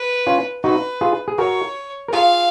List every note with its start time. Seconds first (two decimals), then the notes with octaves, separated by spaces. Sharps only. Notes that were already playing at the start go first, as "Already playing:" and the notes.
Already playing: B4
0.27 C#4 F4
0.64 D#4 F#4 B4
1.01 F4 G#4
1.28 G#4
1.38 F#4 A#4 C#5
2.08 A#4
2.12 F4 G#4 F5